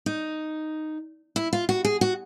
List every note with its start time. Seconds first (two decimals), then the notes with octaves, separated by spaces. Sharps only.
0.06 D#4
1.36 E4
1.53 F4
1.69 F#4
1.85 G#4
2.01 F#4